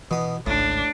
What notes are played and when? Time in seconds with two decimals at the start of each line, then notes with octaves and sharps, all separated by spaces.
0.11 B2 E3 D#6
0.46 G#1 C#2 A2 D4